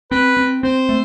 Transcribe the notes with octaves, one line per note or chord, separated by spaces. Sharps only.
C4 B4
C4
C4 C5
A3